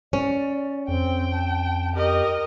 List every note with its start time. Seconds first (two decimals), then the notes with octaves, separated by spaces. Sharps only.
0.13 C#4 D5
0.88 F2 C4 G5
1.32 A5
1.95 G4 A#4 D#5